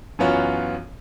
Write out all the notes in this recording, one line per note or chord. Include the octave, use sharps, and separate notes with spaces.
F#2 E3 B3 C#4 F4 F#4